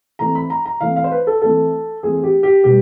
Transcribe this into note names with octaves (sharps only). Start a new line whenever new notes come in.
E3 A3 C4 A#5
B5
A#5
A#5
E3 A3 C4 F5
F5
C5
B4
A4
E3 A3 C4 A4
E3 A3 C4 G#4
G4
G4
B2 G3 G4